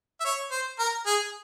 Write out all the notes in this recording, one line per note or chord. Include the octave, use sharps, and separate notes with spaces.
E5
C#5
C5
A#4
G#4